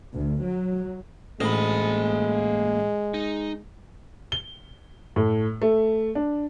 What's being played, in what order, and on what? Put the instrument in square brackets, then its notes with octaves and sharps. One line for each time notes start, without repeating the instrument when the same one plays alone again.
[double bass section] D2
F#3
[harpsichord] A1 D2 D#5 [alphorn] G#3 [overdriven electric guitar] A#3 B5
[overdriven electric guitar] D#4
[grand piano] G7
A2
A3
D4